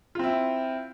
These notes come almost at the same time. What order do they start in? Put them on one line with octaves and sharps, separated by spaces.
F4 C4 E4